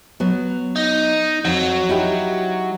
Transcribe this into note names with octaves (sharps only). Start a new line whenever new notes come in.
F#3 B3
D#4
F2 F#3
D#4 E4 G4